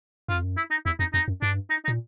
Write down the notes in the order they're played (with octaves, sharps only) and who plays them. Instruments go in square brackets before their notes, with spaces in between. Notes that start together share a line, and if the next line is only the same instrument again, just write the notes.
[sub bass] F#2 [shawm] F4
[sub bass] F2
F#2
[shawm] E4
D#4
[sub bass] E2 [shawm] E4
[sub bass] F2 [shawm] D#4
[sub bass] F2 [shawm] D#4
[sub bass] F#2
[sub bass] G2 [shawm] D4
[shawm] D#4
D#4
[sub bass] A#2